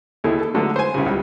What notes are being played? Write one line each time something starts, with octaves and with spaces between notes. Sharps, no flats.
D#2 E4 G#4 A4
A4
D3 F#3 G#3 A3
C5 G#5
C2 C#3
C#2 G3